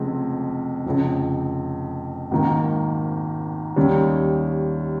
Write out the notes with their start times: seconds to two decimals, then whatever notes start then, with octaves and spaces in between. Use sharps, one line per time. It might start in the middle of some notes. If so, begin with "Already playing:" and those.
Already playing: F1 F2 C#3 G#3 C4
0.86 F1 F2 C#3
2.31 G#1 G#2 D#3 A#3
3.76 D#2 D#3 G3 C#4